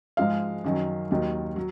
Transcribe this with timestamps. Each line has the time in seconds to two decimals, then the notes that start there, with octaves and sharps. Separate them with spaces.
0.17 G#2 F3 G#3 F5
0.64 F#2 D#3 F#3
1.11 D#2 D#3 F#3
1.56 F#3